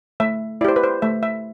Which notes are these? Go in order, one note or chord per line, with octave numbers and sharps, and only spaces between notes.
A3 E5
E4 G4 C5 D5
B4
C5
A3 E5
E5